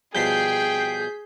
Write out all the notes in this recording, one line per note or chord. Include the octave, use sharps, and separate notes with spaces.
B2 F3 G3 G#4 G5 G6 B6 C7